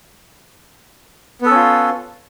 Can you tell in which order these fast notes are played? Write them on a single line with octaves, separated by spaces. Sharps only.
B3 A4 C#4 F4